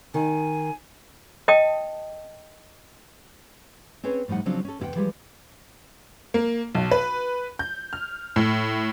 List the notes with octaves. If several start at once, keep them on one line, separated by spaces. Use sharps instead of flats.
D#3 G#5
D#5 G5 A5 D#6
C4 C#4 G#4 B4 C#5
A2 F3 G3 D#4 F#5
C#3 F3 F#3 C4 D4
C#4 A4
E2 C3 E4 G4 F#5 G5
E3 F3 G3 G#3 G4
A#3
B1
B4
G6
F6
A2